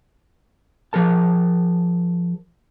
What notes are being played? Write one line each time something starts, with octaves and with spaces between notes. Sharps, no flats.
F3 G#4 A#4 A5